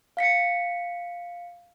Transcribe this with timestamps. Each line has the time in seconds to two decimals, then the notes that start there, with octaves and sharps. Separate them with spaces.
0.17 F5 B6 C#7